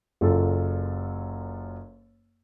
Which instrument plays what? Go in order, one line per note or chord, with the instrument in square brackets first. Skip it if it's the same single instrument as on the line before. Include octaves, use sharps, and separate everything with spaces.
[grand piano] F#1 F#2 F4 A4